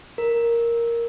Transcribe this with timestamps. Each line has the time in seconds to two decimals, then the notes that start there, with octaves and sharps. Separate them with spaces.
0.18 A#4